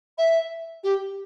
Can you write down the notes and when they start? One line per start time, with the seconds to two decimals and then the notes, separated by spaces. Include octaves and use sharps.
0.18 E5
0.83 G4